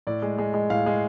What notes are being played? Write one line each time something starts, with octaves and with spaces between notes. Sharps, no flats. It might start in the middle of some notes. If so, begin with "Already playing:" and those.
A2 D5
G#3
G#3
G#3
A2 F5
G#3